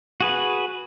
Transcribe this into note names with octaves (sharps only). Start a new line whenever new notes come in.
F#4 G#4 B4